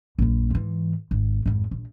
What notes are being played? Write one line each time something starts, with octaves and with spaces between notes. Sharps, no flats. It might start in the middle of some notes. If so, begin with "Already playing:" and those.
A#1 F#2
G#2 E3
G#1
G#1 F2
A#1